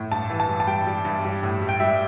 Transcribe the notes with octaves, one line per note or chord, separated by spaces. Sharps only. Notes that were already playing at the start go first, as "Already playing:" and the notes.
Already playing: A2
G2 A5
E3
A5
G2
A5
G3 G5
G3
G2
G3
A2
G3
G5
G3 E5